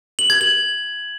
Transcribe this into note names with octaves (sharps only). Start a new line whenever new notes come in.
F#7
G#6
F#7